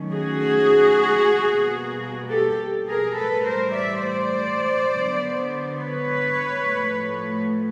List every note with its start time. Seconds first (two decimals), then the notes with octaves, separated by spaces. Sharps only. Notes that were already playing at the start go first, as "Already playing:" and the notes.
Already playing: D#3 F#3 A3 C#4
0.13 F#4 G#4
1.44 B2 G3 A#3
2.30 G4 A4
2.88 G#4 A#4
3.17 A2 E3 G3 A4 B4
3.46 A#4 C5
3.74 D5 E5
4.04 C5 D5
4.91 D3 F#3 B3
5.77 B4 C#5
6.64 A2 F3 A3